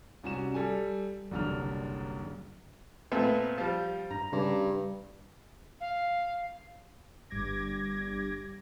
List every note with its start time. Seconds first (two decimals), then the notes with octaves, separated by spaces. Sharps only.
0.23 C2 C#4 F#4 E7
0.54 G3 A4 G#5
1.31 F#1 C2 D3 D4 F6
3.12 A#2 A3 B3 C4
3.58 F3 G3 A5
4.11 G2 A#5
4.32 G2 C#3
5.81 F5
7.30 G1 G2 G3 D6 G#6 A#6